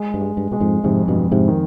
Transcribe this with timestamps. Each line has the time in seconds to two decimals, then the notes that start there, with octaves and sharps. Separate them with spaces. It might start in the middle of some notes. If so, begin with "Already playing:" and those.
Already playing: G#3
0.14 G2
0.21 G#3
0.37 G2
0.51 B2 G#3
0.60 F2 G#2
0.84 F2 G#2 C3
1.08 G2 B2
1.16 F2
1.32 G#2 C3
1.48 D#3